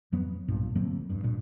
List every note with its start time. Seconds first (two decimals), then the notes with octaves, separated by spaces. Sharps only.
0.12 F2 F#3 B3
0.48 B1 G2 A#2
0.75 D2 F#3 A#3 C4
1.09 E1 G2
1.24 G2 A#2